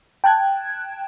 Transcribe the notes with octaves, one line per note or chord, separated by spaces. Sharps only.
G5 A5 F#6 G#6